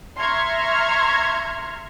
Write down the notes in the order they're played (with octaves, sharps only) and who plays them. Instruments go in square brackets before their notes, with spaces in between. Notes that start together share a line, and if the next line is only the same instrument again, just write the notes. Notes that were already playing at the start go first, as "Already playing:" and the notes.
[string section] E5 A#5 C6 C#6 F6 G#6